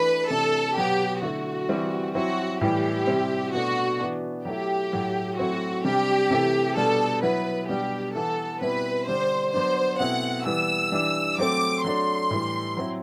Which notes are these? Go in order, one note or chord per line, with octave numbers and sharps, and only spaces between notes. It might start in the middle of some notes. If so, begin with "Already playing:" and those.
Already playing: E3 A3 D4 B4
C3 E3 A3 D4 A4
B2 F#3 B3 G4
D3 A3 E4 F#4
E3 G3 C4 E4
F#3 C4 E4 F#4
A2 E3 G3 G4
C3 G3 C4 E4
B2 A3 D4 F#4
E3 B3 D4
F#3 A3 E4 G4
A2 F#3 A3
F#3 A3 C4 E4 F#4
C3 G3 D4 G4
C3 E3 A3 E4
B2 G3 D4 A4
F#3 B3 E4 B4
B2 G3 D4 G4
E3 B3 E4 A4
B2 G3 C4 E4 B4
D3 G3 D4 C5
F#3 B3 D4 C5
B2 A3 C4 E4 F#5
E3 G3 B3 E6
E3 G3 D4
F#3 A3 C4 D6
F#3 A3 D4 C6
A2 E3 G3
F#3 C4 E4